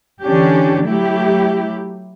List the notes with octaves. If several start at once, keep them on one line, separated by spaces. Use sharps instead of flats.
D3 E3 C#4 D4 G4
F#3 A3 E4 G4